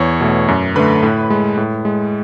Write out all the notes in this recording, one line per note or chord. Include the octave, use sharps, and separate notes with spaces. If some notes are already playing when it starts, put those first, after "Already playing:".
Already playing: E2 C#5 C#6
B2 A3
F#2
D3 A3 B4 B5
A2
G#3
A2
G#3